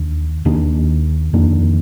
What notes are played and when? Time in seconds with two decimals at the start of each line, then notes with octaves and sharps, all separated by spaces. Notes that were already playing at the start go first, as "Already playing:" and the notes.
Already playing: D#2 D#3 D4
0.45 D#2 D#3 A#3 D4
1.33 F2 D#3 A#3 D4